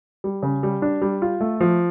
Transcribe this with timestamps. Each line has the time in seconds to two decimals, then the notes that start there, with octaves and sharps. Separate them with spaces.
0.24 G3
0.43 C#3
0.63 G3
0.82 D4
1.02 G3
1.22 F4
1.41 A3
1.60 F3